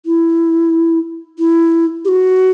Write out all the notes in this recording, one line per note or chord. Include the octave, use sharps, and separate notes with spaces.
E4
E4
G4
F#4